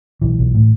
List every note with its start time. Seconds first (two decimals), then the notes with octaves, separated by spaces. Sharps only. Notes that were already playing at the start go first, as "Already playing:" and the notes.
0.21 B1 E3
0.39 B1
0.54 A2